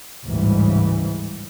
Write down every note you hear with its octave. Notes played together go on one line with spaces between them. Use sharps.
A1 D2 G#2 C#3 E3 G3